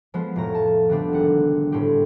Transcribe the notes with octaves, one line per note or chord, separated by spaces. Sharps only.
F3 G#3 B3
F1 A2 A#5
A5
D3 G3 B3 C4 D4
G#1 F#5
A2 G3 C4 G4